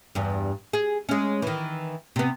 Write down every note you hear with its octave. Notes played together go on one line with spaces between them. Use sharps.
E2 G2
G#4
G#3 C#4
D#3 E3
C3 B3